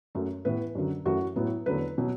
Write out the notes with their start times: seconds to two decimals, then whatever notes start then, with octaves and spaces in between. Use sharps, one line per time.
0.15 F#2 F#3 A3
0.45 A2 E3 B3 B4
0.75 F#2 D3 F#3
1.05 F#2 E3 A3 F#4
1.36 A2 F#3 B3
1.66 E2 D3 F#3 A3 B4
1.98 B2 F#3